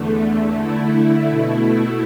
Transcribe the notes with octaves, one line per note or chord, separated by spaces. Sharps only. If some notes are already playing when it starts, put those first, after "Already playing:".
Already playing: E2 D3 A3
D3 A3 E4
B2 A3 E4